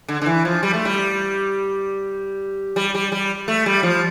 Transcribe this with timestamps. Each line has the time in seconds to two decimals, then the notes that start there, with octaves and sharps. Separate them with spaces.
0.08 D3
0.22 D3
0.26 E3
0.45 F3
0.63 G3
0.73 A3
0.85 G3
2.76 G3
2.94 G3
3.12 G3
3.48 A3
3.66 G3
3.83 F3